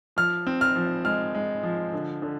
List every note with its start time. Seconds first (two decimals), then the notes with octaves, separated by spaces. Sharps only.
0.17 F3 F6
0.47 C4
0.61 F6
0.76 F3
1.05 G#3 F6
1.35 G#3
1.63 F3
1.93 D3
2.22 D3